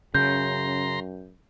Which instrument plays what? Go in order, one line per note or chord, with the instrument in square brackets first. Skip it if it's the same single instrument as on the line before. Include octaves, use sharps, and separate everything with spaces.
[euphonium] F#2 [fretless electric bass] C#3 [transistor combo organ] A#5 C6 [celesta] G6